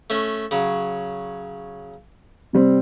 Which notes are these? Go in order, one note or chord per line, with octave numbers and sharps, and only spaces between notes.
A3 C#4
C#3 F#3
C3 G3 C4